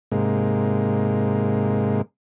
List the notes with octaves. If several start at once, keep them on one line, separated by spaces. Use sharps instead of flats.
G#2 C3 G#3 A#3